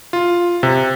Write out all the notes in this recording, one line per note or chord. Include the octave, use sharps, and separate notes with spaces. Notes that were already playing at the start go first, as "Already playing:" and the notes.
F4
C3